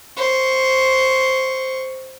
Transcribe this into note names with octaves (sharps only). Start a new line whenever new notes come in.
C5 C#6